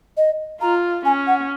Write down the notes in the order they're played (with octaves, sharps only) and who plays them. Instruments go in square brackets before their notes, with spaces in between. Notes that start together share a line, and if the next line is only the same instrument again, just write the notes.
[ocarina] D#5
[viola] F4 [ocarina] A#5
[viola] C#4 [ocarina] G#5
[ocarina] F#5